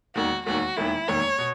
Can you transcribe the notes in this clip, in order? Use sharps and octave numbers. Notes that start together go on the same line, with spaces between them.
E1 D#2 D#3 F#4
E1 D#2 D#3 F#4
E1 D#2 D#3 E4
E1 D#2 D#3 C#5
B2